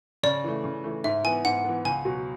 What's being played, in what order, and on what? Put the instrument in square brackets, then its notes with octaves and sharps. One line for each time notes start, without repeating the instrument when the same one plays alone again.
[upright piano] C#3 [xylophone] D5
[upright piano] E3 A3
C#3
E3 A3
[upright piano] G#2 [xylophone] E5
[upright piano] E3 B3 [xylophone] G#5
[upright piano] G#2 [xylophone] F#5
[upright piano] E3 B3
[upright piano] C#2 [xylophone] G#5
[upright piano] B2 F#3